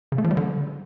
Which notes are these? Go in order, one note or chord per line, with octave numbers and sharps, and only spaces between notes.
C#3
A3
F3
G3
D3